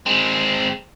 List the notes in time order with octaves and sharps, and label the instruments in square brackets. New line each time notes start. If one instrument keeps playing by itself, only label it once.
[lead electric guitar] G#3 C4